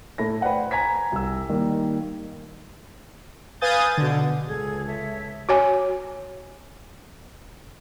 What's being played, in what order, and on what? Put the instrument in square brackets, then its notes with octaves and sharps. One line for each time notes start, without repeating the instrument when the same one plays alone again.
[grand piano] A2 A3 E4 A#6
B4 C5 D5 F#5 G5
G#5 A#5 G#6 B6
C2 E6
D#3 G3 A#3
[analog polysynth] B4 F5 G#5 D#6 G6 A6
B2 D3
[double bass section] C#2 [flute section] G#4 A4 G#6
[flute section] A4 C#5 E5
[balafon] F#4 C#5 G#5